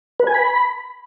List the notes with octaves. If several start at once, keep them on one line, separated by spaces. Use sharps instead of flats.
B4
G#5
B5